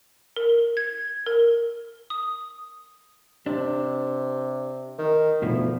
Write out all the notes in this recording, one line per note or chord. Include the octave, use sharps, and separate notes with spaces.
A#4
G#6
A#4
D#6
C3 D4
D#3
D2 B2 F3